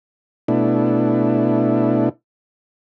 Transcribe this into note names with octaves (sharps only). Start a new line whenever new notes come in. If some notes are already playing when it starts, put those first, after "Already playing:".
B2 A3 D4 E4